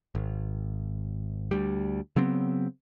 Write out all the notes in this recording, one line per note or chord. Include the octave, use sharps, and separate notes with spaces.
G#1
D2 G3
C#3 F#3 B3 C4